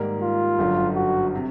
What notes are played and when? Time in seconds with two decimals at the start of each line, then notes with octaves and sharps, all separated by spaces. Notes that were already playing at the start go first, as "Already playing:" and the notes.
Already playing: G#2 D#3 G3 A#3
0.22 F4
0.58 G1 F#2 D3
0.96 F#4
1.35 C3